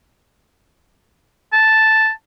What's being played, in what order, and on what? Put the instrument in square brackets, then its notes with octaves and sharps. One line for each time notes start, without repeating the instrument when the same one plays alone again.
[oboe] A5